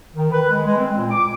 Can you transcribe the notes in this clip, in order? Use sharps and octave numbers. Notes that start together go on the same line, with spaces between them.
D#3
B4
G#3
G#3
C4
A#2
D6